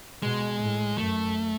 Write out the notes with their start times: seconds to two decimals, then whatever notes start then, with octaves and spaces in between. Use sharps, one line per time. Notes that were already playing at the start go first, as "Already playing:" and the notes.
0.22 B2 G#3
0.60 A2
0.98 F#2 A3